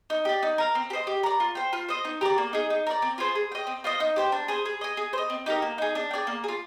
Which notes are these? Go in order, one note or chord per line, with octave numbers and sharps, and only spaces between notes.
D#4
G4 D5
D#4
A#4 F5
C4
G4
C5 D#5
G4
A#4 D5
F4
C5 G5
F4
C5 D#5
D#4
G4 A#4 D5
A#3
D#4 G#4
D#4
A#4 D5
C4
F4 G#4 C5
G#4
D#5 G5
C4
F4 C5 D#5
D#4
G4 C5 G5
D4
G#4 C5
G#4
D#5 G#5
G#4
C5
D#5
C4
D#4 G4 A#4
A#3
D#4 G#4
D4
G#4 D5 G5
A#3
G#4
F4